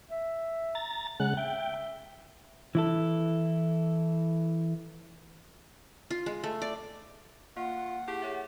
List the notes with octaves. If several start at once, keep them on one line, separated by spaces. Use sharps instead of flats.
E5
A#5 A6
C#3 G#3 F#5 F#6
E5 G5
E3 E4 A4
F4
G#3
A3
D5
A#3 F4 F#5
E4 G4 G#4 G5
G#4 C#5 E5